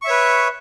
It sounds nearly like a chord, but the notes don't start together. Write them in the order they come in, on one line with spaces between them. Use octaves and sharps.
C#6 E5 C#5 B4